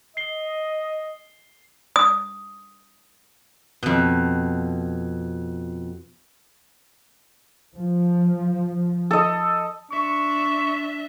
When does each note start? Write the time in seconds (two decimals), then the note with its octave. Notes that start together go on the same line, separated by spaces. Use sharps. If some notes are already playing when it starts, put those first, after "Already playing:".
0.17 D#5 C7 G7
1.96 D#6
3.83 F2 B2
7.76 F3
9.11 A4 D#5
9.91 D4 E5 C#6